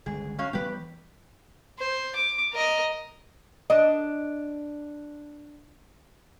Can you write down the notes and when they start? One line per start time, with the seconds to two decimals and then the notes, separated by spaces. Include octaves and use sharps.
0.06 G1 C#2 G#4
0.38 F#3 C#4 F5
0.53 E3 G3 B3 G4 B4
1.79 C5
2.15 D6
2.53 A#4 D#5
3.70 D4 D#5